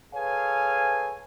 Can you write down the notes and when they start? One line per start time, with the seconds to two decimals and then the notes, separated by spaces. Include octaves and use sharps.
0.14 G#4 A4 B4 C#5 F5 G#5